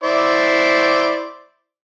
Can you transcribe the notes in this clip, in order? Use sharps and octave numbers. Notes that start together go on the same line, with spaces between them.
E4 C5 D5